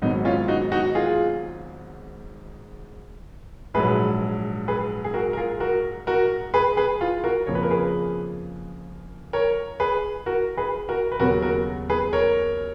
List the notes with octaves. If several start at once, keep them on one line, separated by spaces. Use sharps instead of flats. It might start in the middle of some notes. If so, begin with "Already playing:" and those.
G#1 G#2 F#3 B3 D#4
C#4 F4
D#4 F#4
D#4 F#4
F4 G#4
A#1 G#2 F#3 G#4 B4
G#4 B4
G#4
F#4 A#4
A#4
F4 G#4
F#4 A#4
F#4 A#4
G#4 B4
G#4 B4
F4 G#4
F#4 A#4
F2 C#3 F3 A#3 C#5
B4
A#4
G#4 B4
A#4 C#5
G#4 B4
F#4 A#4
G#4 B4
F#4 A#4
B4
D#2 C#3 F#3 B3 F#4 A#4
F#4 A#4
G#4 B4
A#4 C#5